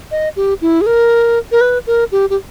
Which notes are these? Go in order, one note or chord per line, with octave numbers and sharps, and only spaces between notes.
D#5
G4
E4
G#4
A#4
A#4
B4
A#4
G4
G4